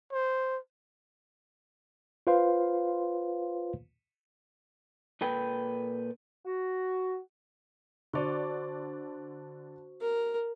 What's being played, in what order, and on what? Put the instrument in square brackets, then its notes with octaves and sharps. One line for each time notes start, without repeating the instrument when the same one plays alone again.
[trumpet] C5
[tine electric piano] F4 B4 C5 F5 C6
[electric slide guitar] A#2 A4 B4 G5
[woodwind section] F#4
[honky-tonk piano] D3 D5 [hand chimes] F#4 C5 C#6
[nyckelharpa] A#4